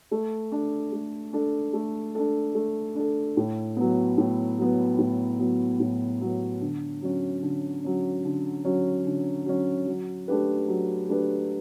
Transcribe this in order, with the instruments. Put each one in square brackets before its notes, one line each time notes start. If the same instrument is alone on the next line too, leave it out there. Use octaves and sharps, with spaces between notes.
[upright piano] A3
D4 A4
A3
D4 A4
A3
D4 A4
A3
D4 A4
A2
F#3 B3
A2
F#3 B3
A2
F#3 B3
A2
F#3 B3
D3
F#3 C#4
D3
F#3 C#4
D3
F#3 C#4
D3
F#3 C#4
F#3
A3 D4 G4 B4
F#3
A3 D4 G4 B4